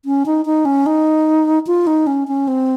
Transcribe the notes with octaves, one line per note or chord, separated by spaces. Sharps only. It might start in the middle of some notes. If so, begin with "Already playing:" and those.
C#4
D#4
D#4
C#4
D#4
F4
D#4
C#4
C#4
C4